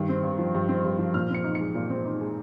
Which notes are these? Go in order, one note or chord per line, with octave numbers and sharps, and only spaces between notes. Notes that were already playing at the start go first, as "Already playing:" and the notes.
Already playing: G2 D#3
C4
G2
F3
G2
C4
G2
F3
A#2 F6
C4 C#7
D#4
G#3 C#7
A#2
C4
D#4
G#3